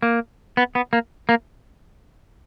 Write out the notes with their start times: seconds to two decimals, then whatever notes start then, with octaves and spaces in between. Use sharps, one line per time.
0.02 A#3
0.57 B3
0.75 B3
0.93 A#3
1.29 A#3